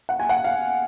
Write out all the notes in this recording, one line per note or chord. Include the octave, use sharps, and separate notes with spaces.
F#5
G#5
F#5
F5